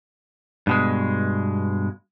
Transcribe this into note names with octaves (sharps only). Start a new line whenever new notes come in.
G2 B2 G#3